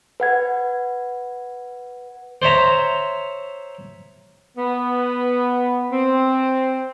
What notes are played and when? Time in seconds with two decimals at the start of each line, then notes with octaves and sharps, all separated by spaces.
0.20 B4 F#5 G#6
2.42 C5 C#5 E5 A#5
4.57 B3
5.91 C4